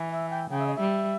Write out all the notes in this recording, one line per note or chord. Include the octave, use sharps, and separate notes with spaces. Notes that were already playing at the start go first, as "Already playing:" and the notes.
Already playing: E3
E5
G5
C#3 G5
E5
D#5
G3 E5